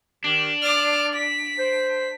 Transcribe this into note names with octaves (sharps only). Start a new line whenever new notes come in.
D#3 D4 G4
D5 D6 F6
B6
C5